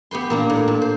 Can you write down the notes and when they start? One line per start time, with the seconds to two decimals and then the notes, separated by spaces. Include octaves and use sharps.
0.11 B3 G4 B4 C6
0.30 A#2 A#3 D4
0.50 A2
0.68 A#2
0.82 C5